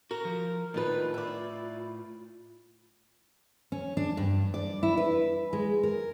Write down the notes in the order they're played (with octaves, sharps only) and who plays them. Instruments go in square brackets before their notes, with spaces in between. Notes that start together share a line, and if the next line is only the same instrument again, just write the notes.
[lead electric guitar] F#4 [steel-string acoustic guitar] A#4
[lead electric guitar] F3
[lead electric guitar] A2 F4 [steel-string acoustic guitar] D#3 D4 B4
[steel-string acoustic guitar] E4 D5
C#4
D4
G2
D5
E4
B4
G#3
A#4